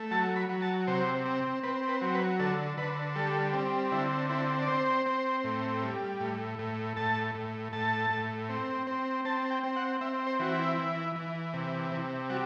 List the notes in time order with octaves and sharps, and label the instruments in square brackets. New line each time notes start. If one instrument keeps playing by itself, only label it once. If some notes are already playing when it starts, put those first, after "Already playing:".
Already playing: [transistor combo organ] A3
F#3 A5
B5
F#3
A5
C3 C5
C4
C4 B4
B4
F#3
B4
D3 A4
D3 B4
G3 A4
C4
D3 E4
C4 E4
D5
C4 C5
C4
A2
G3
A2
A2
A2 A5
A2
A2 A5
A2
C4
C4
C4 A5
G5
C4
F#5
C4 E5
C5
E3 F#4
E4
E3
E3
C3
C3
G3 F#4